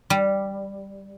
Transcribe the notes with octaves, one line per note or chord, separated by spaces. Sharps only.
G3